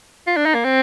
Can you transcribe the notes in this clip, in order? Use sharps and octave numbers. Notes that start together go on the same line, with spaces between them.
F4
D4
D#4
A#3
C4